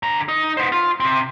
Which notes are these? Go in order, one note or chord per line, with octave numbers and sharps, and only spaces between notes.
D3 A#5
D#4
B3 C5
F4
C3 C4